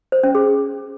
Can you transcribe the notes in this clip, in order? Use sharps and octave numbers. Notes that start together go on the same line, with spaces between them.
C5
C#4
G#4